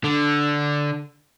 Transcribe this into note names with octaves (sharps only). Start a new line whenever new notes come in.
D3